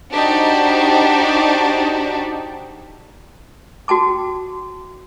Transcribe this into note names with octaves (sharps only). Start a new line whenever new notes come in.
D4 D#4 F#4 G4 C5 D5
F#4 G5 A5 D6